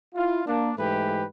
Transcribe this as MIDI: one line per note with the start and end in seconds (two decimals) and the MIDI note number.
0.15 0.41 64
0.15 0.41 65
0.46 0.70 58
0.46 0.70 62
0.77 1.24 44
0.77 1.24 52
0.77 1.24 56
0.77 1.24 57
0.77 1.24 67
0.77 1.24 71